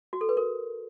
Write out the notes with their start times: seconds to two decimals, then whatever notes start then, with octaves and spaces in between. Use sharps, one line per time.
0.13 F#4
0.21 A4
0.29 B4
0.37 A#4